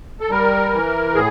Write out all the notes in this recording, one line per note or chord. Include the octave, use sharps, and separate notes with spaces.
A4
G3 A#4
E3
A2 G#4